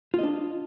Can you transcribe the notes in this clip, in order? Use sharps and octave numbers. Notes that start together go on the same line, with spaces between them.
D4 F4 D#5